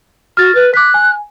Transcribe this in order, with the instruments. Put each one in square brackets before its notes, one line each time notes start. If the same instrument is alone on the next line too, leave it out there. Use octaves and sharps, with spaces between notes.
[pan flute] F#4 [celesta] F6 A6
[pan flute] B4
[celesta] D6 B6 [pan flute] F#6
[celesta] G#5